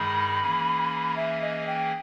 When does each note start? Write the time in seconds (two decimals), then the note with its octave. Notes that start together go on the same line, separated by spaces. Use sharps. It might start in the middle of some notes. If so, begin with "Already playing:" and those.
Already playing: G2 D#3 G#3 D#4 G#4 B5
0.40 E3 A#3 C#4 G#4
1.16 E5
1.42 D#5
1.67 G5